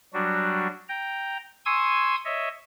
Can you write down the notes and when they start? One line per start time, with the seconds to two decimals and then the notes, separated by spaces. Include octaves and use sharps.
0.14 F#3 G3 D4 F#4
0.89 G5 A#5
1.65 G#5 C6 C#6 D#6 E6 G#6
2.25 C#5 D#5 E5